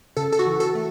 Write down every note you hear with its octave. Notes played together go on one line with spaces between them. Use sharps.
C#3 A4
A4
F#4
E3
A4
A3